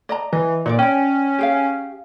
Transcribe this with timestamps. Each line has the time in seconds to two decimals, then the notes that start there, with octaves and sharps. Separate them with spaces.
0.09 D5 D#5 A#5
0.33 E3 D#5
0.66 A#2 D#4 C#5 D5
0.79 C#4 D5 G5
1.39 G4 G#4 F5